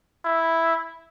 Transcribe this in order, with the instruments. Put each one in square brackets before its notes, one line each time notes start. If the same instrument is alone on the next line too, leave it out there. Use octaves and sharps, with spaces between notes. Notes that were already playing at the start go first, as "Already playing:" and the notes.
[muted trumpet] E4